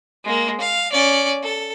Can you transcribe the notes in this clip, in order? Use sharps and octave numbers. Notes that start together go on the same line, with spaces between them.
G#3 A#3
F5
C#4 D5
A4